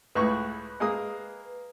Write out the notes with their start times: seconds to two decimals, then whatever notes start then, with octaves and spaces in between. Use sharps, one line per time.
0.15 C#2 A2 B4 C#6
0.80 G#3 A#3 D#6